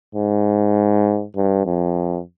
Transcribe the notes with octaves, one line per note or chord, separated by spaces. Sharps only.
G#2
G2
F2